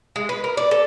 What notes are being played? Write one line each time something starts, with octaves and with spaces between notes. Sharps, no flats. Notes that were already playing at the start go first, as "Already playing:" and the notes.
G#3
B4
A#4
D5
A4